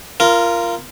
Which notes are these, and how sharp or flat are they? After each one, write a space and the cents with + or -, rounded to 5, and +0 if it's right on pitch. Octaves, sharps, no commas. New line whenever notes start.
F4 -20 A#4 +0